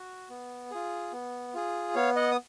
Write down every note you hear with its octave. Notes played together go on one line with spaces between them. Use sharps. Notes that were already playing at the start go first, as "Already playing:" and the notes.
Already playing: F#4
B3
F4 G#4
B3
F4 G#4
B3 C#5 F5
D#5 F#5
D#6